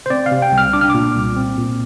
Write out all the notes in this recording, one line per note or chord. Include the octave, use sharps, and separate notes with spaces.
C5
C4 D5
F5
C3
G5
C2
F6
D4 D6
F6
A#2 D6
C2
C4
A#2